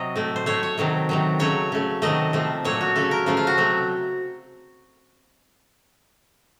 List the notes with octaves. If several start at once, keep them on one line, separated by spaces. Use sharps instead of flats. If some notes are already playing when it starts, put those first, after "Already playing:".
Already playing: C3 F#3 D#5
A2 A3
C5
A2 A3 C#5
C#5
C3 D#3 F#3 A3
C3 D#3 F#3
C#3 F#3 A3 C#5
C#3 A3
C3 D#3 F#3 A3 D#5
C3 F3 A3
A#2 F#3 A3 C#5
F#4
C#3 A3 A4
A#4
C#3 F3 A3 F4
F4
F#4
C3 F#3 A3